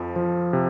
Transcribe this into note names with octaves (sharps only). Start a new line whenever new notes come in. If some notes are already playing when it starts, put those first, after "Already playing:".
Already playing: F2 F3
F3
C3